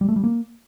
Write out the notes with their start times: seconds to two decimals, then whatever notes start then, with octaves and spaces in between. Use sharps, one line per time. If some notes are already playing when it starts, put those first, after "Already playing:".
0.01 G3
0.09 A3
0.16 G3
0.24 A#3